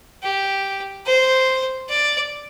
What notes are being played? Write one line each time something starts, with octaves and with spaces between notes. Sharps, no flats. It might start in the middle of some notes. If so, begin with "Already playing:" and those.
G4
C5
D5